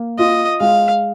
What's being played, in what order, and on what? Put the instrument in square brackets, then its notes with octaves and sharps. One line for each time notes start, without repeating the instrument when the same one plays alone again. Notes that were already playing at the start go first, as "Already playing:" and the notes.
Already playing: [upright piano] A#3
[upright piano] F4 [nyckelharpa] D#5
[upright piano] G#3 [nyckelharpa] F5